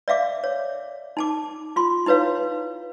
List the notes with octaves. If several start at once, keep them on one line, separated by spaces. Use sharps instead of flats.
D5 E5 F5 D6
C#5
D#4 A5 D6
F4 C6
D#4 E4 B4 C#5 F5